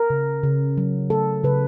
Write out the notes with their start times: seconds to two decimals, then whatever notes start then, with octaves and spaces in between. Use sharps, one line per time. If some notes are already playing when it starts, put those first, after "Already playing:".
Already playing: A#4
0.10 C#3
0.43 C#3
0.78 F#3
1.10 A3 A4
1.44 C#3 B4